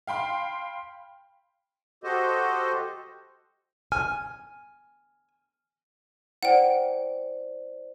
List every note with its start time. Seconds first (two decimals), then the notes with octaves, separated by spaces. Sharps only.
0.07 F5 G5 B5 C6
2.04 F#4 G4 A4 C5 D#5
3.92 G#5 F6
6.43 E4 C5 D5 F#5 G5